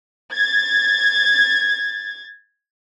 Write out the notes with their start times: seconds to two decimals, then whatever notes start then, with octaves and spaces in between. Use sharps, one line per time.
0.32 G#6 A6